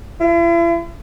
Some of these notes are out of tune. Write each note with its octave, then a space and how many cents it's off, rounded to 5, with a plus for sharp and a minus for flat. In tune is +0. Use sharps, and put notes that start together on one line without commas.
E4 +45